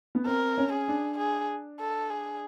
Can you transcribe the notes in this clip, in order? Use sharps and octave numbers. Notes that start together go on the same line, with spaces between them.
B3
C4 A#4
C#4
G#4
D4
G#4
A4
G#4